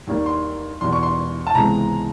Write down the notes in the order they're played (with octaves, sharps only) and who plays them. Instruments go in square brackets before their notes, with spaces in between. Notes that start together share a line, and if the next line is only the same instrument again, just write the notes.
[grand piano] D#2 D#3 G3 A#3
[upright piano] C6
[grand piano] E2 B2 G3 [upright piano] C6
[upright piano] C#6
C6
A5
[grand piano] C#2 C3 E3 G#3 B3 [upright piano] A#5